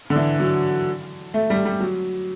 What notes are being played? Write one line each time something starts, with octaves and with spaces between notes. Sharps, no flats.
D3
E3
F#3
A3
G3
G3
F#3